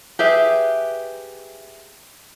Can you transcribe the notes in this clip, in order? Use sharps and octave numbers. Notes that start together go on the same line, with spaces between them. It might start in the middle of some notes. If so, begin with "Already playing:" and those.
G4 G#4 B4 E5